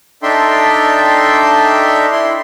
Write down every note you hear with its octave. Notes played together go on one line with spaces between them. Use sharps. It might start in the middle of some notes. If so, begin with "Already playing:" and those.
D4 D#4 A4 E5 G5 C6
E4 C6